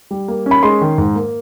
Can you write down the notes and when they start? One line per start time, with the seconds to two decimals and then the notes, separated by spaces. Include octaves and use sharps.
0.11 G3
0.28 A#3
0.46 C#4
0.51 B5
0.63 G#3 C6
0.81 D#3
0.98 G#2
1.16 A#3